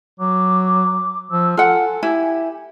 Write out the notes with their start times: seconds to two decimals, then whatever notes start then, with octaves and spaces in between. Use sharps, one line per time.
0.20 F#3 D6
1.31 F3 E6
1.57 F4 A4 F#5 G#5
2.03 E4 G4